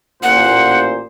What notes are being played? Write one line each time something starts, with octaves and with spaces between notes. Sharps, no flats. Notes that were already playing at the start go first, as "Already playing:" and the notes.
A1 A#2 C5 F#5